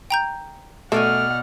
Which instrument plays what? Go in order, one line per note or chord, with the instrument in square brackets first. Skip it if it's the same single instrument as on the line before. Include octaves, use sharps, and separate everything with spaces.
[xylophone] G5 A#5 G6
[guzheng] B2 D5 G#5 [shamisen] A3 [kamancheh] F#5 F6